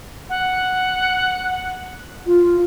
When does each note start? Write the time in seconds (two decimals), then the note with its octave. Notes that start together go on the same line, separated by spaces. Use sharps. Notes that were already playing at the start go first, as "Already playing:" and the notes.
0.29 F#5
2.26 F4